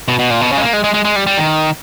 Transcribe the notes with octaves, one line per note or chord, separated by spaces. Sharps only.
B2
B2
A#2
B2
C#3
G#3
A#3
G#3
G#3
G#3
G#3
G3
G3
D#3